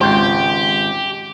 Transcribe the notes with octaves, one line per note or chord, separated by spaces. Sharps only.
G#1 C#2 G4 C5